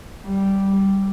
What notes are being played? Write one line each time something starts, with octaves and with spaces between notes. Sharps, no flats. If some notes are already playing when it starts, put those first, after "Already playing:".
G3